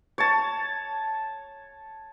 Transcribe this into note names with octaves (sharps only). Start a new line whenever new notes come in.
C#5 A5